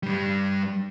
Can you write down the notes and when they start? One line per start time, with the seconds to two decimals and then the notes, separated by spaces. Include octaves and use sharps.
0.03 G2 G3